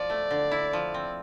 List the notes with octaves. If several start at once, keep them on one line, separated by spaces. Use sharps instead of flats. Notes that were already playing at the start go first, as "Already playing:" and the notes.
Already playing: F3 D5
A3
D3
E4
F3
C4